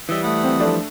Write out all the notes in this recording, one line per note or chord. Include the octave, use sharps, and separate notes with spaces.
E3 G3 D#5 E5
A3 F#5 B5 D#6
C4
F3 A3 D4